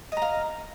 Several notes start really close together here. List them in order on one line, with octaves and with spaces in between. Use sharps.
D#5 A#5 F5